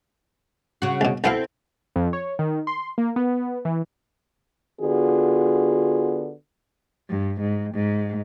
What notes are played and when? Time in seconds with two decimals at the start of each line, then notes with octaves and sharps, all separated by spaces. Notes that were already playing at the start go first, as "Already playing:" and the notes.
0.82 C#3 F#4
1.01 C2 B2
1.24 B1 B3 C4 E4 A4 F5
1.96 F2
2.13 C#5
2.39 D#3
2.67 C6
2.98 A#3
3.16 B3
3.65 E3
4.80 D3 B3 F4 F#4 G#4
7.09 G2
7.41 G#2
7.74 G#2